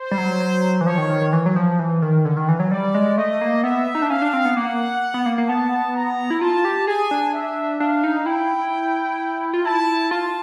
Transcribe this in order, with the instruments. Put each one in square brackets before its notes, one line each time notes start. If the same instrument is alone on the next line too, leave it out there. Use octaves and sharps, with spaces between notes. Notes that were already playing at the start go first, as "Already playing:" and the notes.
Already playing: [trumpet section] C5
[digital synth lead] G3
F#3
F#3
E3
[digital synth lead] F3 [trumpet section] C#5
[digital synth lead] D#3
D#3
D#3
E3
F#3
F3
E3
D#3
D3
D#3
E3
F#3
[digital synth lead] G3 [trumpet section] D5
[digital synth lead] G#3
[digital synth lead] A3 [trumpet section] D#5
[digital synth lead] A#3
[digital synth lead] B3 [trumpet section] E5
[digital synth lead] D#4
D4
[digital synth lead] C#4 [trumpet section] F5
[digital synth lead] D4
C4
B3
[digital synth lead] A#3 [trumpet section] F#5
[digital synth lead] B3
A#3
A#3
[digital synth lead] B3 [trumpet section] A5
[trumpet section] A#5
[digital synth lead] E4
[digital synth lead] F4 [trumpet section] A5
[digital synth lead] G4
[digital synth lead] G#4 [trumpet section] G#5
[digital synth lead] D4
[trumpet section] E5
[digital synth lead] D4 [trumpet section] F5
[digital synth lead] D#4
[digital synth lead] E4 [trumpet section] G5
[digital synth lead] F4
[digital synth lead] E4 [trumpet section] A5
[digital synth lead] F4 [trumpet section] A5